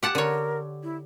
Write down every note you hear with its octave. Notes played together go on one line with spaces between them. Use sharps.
G4 F#5 A5
D3 A#4 C#5
E4